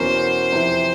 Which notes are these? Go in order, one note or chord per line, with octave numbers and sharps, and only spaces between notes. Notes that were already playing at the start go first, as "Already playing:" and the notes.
Already playing: E2 B2 F#3 A#3 C#4 C5
F2 C3 E3